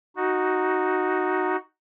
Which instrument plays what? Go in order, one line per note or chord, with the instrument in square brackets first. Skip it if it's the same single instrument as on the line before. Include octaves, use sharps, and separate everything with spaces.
[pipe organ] D#4 F#4